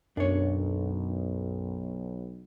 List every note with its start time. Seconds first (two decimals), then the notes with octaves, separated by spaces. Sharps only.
0.17 B1 F#2 D4 C#5